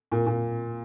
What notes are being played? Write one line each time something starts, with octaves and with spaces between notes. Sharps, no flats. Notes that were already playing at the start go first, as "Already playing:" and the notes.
A#2
A#2